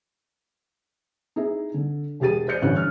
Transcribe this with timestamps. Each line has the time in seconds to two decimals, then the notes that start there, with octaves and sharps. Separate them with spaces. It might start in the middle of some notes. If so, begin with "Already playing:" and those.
1.36 D#4 E4 G#4
1.74 D3
2.20 E1 G4 G#4 A6 D#7
2.48 C5 D5 G6 C#7
2.62 A1 G2 D3 E3 C#4 F#6
2.77 F6